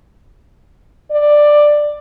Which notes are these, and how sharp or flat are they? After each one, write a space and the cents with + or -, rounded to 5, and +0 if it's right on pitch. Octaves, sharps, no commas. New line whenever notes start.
D5 +10